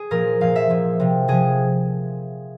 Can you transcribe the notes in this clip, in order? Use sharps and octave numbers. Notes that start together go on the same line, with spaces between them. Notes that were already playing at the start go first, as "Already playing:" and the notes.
Already playing: G#4
A#2 F3 A#4
A#2 F3 F5
E5
A#2 F3
C3 F3
C3 F3 G#4